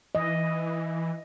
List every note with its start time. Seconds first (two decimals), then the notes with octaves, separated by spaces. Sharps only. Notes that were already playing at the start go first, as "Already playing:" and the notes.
0.15 E3 D#5